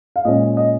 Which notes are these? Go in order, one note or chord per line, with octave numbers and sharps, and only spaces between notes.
F5
A#2 G#3 C#4 D#5
D#5